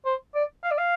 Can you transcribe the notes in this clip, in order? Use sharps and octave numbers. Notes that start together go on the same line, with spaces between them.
C5
D5
F5
D5
F5